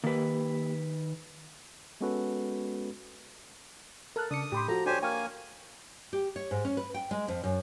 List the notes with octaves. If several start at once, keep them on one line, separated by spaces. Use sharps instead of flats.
D#3 A#3 G4 B4
G#3 B3 C#4 F#4 A4 B4
A4 A#4 F6 F#6
C#3 D4 D#6 C#7
A2 G4 B5 C6
F3 F#4 A4 A#5
D4 G4 C5 C#5 G#5
A#3 G5 G#5 C#6 F6
G4
C#5
G#2
C#4
B4
G5
G#3
F2
F#2